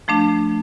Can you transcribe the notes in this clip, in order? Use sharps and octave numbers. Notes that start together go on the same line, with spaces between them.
F3 A3 D4